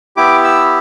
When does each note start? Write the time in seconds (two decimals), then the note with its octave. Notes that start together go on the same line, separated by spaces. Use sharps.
0.17 B3 E4 G4 D6
0.44 E6